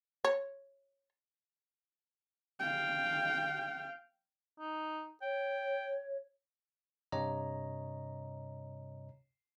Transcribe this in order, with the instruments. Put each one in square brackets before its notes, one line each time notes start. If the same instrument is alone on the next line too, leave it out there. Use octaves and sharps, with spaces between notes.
[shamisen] C#5
[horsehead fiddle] F5 G5
[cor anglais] D#4
[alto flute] C#5 [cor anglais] G5
[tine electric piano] G2 C3 C#5 D#5 A#5